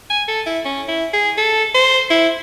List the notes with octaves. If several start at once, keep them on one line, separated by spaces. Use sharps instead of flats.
G#5
A4
E4
C#4
E4
G#4
A4
C5
E4